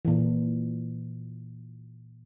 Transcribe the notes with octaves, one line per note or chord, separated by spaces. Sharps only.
A#2 E3